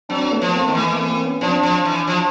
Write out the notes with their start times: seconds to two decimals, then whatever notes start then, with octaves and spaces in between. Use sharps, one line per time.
0.09 F#3 C4 D4
0.31 A3 B3
0.42 F3
0.53 A#3 C4
0.68 D#3
0.75 E3 A3 B3
0.92 A#3 C4
1.08 A#3 C4
1.25 B3 C#4
1.41 F3 C4 D4
1.63 F3
1.85 E3
2.07 F3